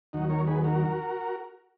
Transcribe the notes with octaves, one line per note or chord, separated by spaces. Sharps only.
D#2 D#3 F#3 D#4 F#4
A#4 C#5
G#4 B4
F#4 A#4